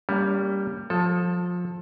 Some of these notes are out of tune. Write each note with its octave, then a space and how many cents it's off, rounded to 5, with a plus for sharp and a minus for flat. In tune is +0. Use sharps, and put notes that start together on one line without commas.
G3 +5 A#3 -10 C#4 +35
F3 +25 A4 +0